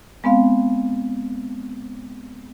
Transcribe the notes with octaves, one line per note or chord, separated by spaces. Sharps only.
G#3 B3 C4 F5